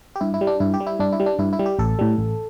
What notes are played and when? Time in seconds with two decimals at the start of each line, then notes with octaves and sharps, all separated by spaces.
0.16 G4
0.21 G2 E4
0.34 E4
0.41 G3
0.47 D4
0.60 G2 E4
0.74 G4
0.80 G3
0.87 E4
0.99 G2 D4
1.12 E4
1.20 G3
1.26 D4
1.39 G2 E4
1.53 E4
1.59 G3
1.66 G4
1.79 A1 A4
1.99 A2 G3
2.18 A1